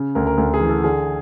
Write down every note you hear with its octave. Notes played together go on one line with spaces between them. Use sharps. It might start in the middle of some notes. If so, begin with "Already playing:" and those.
Already playing: C#3
D2 A#4
A#4
D2
G#4
E3
A4
D3 G#4